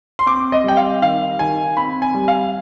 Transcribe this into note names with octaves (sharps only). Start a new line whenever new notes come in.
C6
C4 D6
D#5
G3 G5
F5
D#3 F5
D#3 G#5
C4 B5
G#5
G3
F5